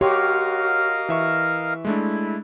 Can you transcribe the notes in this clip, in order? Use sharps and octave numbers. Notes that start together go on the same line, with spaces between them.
F#4 G4 A#4 C#5 D#5 F5 C6 C#6
E3 E5 C#6
G#3 A3 D4 E4